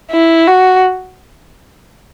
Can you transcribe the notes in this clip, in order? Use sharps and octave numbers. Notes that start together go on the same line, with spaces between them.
E4
F#4